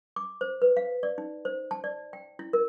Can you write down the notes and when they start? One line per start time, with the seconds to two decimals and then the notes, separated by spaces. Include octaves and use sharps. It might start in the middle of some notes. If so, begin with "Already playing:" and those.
0.16 D6
0.41 C5
0.62 B4
0.77 F5
1.03 D5
1.18 D#4
1.45 C5
1.71 A5
1.84 D5
2.13 G5
2.39 E4
2.53 A#4